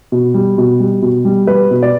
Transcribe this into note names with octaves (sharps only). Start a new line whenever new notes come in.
B2
G3
B2
G3
B2
G3
G3 B4
B2
D5